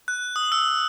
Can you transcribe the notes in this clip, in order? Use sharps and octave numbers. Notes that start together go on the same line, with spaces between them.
F#6
D#6
E6